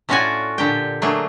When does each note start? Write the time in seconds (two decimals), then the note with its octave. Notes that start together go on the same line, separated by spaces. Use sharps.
0.09 A2 C#4 F4 F#4 D5 G#5
0.58 A#2 D3 G4 G5
1.02 F#3 A3 A#3 D4 G#4